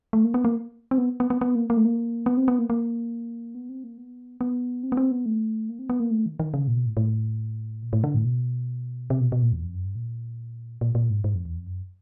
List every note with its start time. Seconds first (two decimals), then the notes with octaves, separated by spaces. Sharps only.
0.13 A3
0.24 A#3
0.34 B3
0.45 A#3
0.91 C4
0.98 B3
1.20 B3
1.30 B3
1.41 B3
1.55 A#3
1.70 A#3
1.77 A3
1.85 A#3
2.26 B3
2.37 C4
2.48 B3
2.59 A#3
2.70 A#3
3.55 B3
3.69 C4
3.84 A#3
3.98 B3
4.41 B3
4.83 C4
4.92 B3
4.97 C4
5.11 B3
5.26 A3
5.69 A#3
5.79 C4
5.90 B3
6.00 A#3
6.11 A3
6.26 D#3
6.40 D#3
6.54 C#3
6.68 A#2
6.75 B2
6.86 A2
6.97 A2
7.83 A#2
7.93 A2
8.04 D3
8.14 A2
8.25 B2
9.10 C3
9.20 B2
9.32 B2
9.42 A#2
9.53 E2
9.64 F2
9.74 F#2
9.85 G2
9.95 A#2
10.81 A#2
10.95 A#2
11.10 G#2
11.24 G#2
11.35 F2
11.45 E2
11.56 F2
11.67 F#2